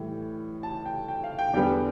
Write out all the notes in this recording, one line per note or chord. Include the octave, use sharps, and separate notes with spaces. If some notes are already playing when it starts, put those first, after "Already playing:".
Already playing: A2 E3 G3
A5
G5
G5
F5
G5
E2 D3 G3 B3 G5